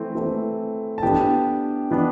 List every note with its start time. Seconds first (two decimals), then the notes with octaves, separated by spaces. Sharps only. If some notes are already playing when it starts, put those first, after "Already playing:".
Already playing: E3 A3 C4
0.15 E3 A3 C4
0.98 A5
1.02 E3 B3 D4 G4 G5
1.91 E3 B3 D4